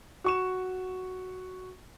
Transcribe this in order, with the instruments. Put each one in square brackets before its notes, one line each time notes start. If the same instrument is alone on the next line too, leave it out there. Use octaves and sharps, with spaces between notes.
[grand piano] F#4 C#6 E7